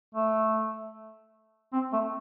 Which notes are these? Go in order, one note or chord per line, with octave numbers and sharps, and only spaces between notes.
A3
C4
A3